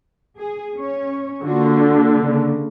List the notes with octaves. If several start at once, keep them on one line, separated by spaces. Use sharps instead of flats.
G#4
C#4 C#5
D3 A#3 F4 F#4
A#3
C#3 A#3